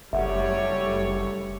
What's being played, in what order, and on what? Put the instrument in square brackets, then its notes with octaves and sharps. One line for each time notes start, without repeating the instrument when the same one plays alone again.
[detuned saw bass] F#1 [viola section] G3 A3 C#5 [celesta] E5 F#5